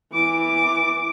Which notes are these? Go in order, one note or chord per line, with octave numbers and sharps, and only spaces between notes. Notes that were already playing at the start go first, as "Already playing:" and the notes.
E3 D6